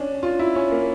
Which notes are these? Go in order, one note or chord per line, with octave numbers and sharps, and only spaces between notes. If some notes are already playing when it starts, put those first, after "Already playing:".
Already playing: C#4 D4
F4
E4
C#4
A#3